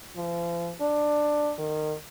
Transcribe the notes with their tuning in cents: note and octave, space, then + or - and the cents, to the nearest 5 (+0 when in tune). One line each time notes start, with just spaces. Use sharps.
F3 -40
D4 +10
D#3 -25